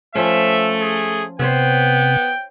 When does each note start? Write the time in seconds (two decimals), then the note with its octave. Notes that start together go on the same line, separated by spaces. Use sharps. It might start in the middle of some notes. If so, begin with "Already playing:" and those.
0.15 F3 A3 C#4 E5
0.82 G#4
1.39 C3 B3 C5 C#5 E5 G5